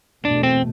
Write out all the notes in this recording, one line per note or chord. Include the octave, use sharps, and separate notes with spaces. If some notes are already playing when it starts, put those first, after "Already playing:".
E2 B2 A3 D4
C4